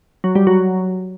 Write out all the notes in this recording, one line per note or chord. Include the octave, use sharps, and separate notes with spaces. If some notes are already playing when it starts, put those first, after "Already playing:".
F#3
G3
F#3